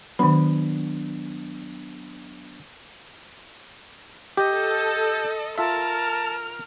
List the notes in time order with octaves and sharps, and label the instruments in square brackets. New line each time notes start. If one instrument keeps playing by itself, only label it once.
[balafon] D#3 B5 [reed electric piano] F#3 B3 D4
[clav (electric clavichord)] G4 [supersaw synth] A4 [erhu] D#5 [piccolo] G6
[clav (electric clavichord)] F4 E5 [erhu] A#4 [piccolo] A5 [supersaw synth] F6